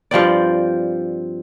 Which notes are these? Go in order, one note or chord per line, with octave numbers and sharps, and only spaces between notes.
G2 F3 C4 D5